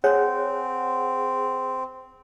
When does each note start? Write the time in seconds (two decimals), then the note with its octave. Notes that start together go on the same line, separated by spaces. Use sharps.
0.04 C4 G#4 C#5 F#5